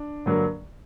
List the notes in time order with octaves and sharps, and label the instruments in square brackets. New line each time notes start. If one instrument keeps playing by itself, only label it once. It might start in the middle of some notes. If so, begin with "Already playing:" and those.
Already playing: [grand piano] D4
[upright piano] G2 D3 F#3 A#3